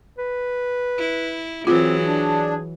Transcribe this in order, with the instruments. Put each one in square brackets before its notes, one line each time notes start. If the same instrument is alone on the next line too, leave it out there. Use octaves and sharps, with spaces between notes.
[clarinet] B4
[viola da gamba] E4
[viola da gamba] E3 F#3 [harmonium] C4 [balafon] F4 [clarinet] G#4
[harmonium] D4